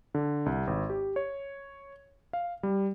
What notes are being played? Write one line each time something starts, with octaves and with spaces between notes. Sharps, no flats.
D3
C2
G#1
G4
C#5
F5
G3